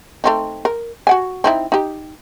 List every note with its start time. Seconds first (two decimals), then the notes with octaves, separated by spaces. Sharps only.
0.24 A3 C4 D#4
0.65 A#4
1.07 F#4 F#5 G#5
1.44 C4 D#4 E4
1.72 D#4 G4